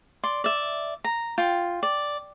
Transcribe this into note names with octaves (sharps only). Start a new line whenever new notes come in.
D5 C6
D5 E5
A#5
F4 G5
D5